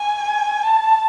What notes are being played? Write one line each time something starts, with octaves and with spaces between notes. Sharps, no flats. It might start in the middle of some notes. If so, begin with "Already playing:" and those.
Already playing: G#5
A5